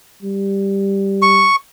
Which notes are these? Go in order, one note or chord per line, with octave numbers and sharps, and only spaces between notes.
G3
C#6